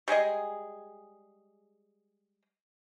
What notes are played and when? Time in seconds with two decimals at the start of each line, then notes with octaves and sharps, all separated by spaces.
0.08 G3 G#3 G#4 D#5